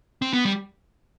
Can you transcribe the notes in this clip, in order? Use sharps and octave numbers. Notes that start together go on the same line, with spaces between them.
C4
B3
G3